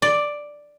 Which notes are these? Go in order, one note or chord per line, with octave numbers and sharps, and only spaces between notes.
D5